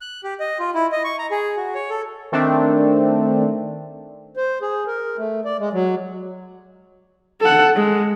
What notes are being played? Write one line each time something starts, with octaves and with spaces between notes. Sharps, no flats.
F#6
G4
D#5
F4
E4
D#5
C#6
A#5
G#4
F#4
C#5
A4
D#3 A3 C4 D4
C5
G#4
A#4
A3
D5
G#3
F#3
A4 F#5
G#3